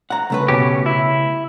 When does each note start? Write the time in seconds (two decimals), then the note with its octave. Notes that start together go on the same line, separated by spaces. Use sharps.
0.10 F#5 A#5
0.30 C#3 A3 B4
0.48 B2 C#4 G4
0.86 E4